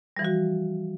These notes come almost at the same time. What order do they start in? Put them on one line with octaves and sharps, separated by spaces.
G3 E3 F3 F#4